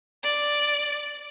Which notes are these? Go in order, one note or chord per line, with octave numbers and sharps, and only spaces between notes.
D5